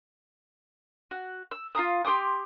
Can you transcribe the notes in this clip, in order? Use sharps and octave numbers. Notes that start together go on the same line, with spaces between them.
F#4
E6
F4 F5 A#5 D#6
G4 C6 D6 D#6